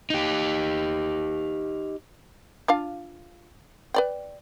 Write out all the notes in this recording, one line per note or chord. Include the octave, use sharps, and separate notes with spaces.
D#4 G4
D4 F4 F5
B4 D5 G5